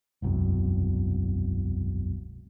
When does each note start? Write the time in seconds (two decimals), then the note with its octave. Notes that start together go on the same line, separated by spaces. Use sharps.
0.22 E1 C2 F#2